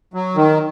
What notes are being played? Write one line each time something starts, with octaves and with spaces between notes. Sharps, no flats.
F#3
D#3